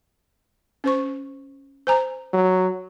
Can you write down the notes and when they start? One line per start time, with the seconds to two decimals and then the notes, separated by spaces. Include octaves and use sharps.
0.84 C#4 C5 C#6
1.87 C5 G#5 A#5
2.33 F#3